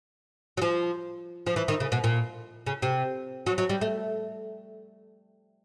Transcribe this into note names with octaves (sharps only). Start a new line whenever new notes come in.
F#3
F3
F3
E3
D#3
C#3
B2
A#2
C#3
C3
F#3
F#3
G3
A3